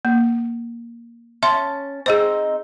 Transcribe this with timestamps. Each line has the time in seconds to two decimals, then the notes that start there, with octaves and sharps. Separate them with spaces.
0.05 A#3
1.43 C#4 E5 A5 C6
2.06 C4 D#4 G#4 C5